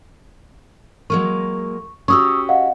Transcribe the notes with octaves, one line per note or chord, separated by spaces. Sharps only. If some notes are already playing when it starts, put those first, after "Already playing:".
F#3 G#3 A#3 C#6
C#4 F#4 G4 C#6 D#6 E6
D#5 F5 F#5